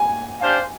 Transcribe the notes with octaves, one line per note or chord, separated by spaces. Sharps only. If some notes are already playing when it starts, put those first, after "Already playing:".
Already playing: G#5
D4 G4 C5 F5